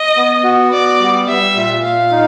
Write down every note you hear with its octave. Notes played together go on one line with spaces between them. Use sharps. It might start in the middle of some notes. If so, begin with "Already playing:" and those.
Already playing: D#5
B3
F#4
B3 D5
G3
G3 E5
A#2
A#2 F5
D#4